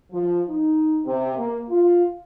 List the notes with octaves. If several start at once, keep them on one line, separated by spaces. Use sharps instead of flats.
F3
D#4
C3
A#3
F4